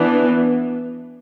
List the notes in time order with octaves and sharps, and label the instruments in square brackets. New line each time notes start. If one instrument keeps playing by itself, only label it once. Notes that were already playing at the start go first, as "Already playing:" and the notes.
Already playing: [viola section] E3 B3 D4